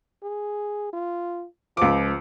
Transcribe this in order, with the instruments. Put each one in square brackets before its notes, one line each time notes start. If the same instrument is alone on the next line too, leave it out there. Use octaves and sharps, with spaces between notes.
[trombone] G#4
F4
[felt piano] C#2 D6 [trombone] F3